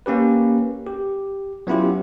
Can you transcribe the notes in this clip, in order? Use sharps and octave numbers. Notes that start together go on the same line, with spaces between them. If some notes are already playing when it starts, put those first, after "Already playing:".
A#3 C#4 G4 B4
G4
F#3 B3 C#4 E4 F4 G4